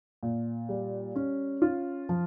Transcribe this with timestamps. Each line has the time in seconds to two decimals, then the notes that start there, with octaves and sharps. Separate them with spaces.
0.23 A#2
0.69 G3
1.16 C#4
1.62 F4
2.09 F3